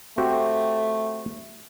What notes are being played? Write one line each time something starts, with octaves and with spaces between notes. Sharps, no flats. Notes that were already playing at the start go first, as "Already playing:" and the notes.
A3 C4 F#4 G4